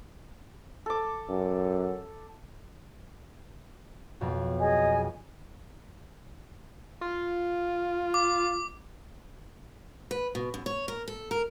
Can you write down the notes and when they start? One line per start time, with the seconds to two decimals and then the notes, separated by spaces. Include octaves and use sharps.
0.86 A4 D6
1.29 F#2
4.21 B1 F2 B2
4.60 G#4 D#5 G#5
7.01 F4
8.14 D6
10.11 B4
10.35 B2
10.54 F#2
10.66 C#5
10.88 A#4
11.08 A4
11.31 A#4